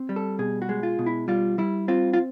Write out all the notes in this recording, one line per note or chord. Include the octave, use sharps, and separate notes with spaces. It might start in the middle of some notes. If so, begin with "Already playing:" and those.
Already playing: C4
G3
A4
B2 G#4
F#4
G#3
F4
B2
E4
G3 F4
G3 E4
C4 F4
F4